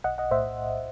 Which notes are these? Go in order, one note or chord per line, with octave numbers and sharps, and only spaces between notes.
B1 D#5 F#5
D#5 F#5
A2 C5 E5